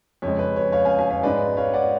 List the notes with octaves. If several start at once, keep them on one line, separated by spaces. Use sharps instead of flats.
F2 C#3 G#3 C#5
B4
C#5
C#5 F5
F5 G#5
F5 G#5
C#5 F5
G#2 G#3 B4 D5
C#5 F5
D5 F#5